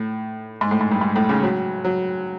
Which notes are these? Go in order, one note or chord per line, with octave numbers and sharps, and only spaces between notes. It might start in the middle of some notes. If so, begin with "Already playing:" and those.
Already playing: A2
G#2
A2
G#2
G2
G#2
A2
C#3
F#3
F#3